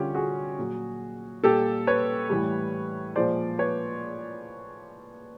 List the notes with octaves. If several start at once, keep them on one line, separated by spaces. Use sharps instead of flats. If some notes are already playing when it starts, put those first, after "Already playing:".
Already playing: D3 G3 C#4 F4 G4
F#4 G#4
A#2 F#3
A#2 G3 G4 A4
B4 C#5
A2 E3 G3
A#2 F3 G#3 C5 D5
B4 C#5